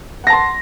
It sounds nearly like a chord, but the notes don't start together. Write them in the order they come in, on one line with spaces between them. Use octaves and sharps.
F#5 A#6 A5 C6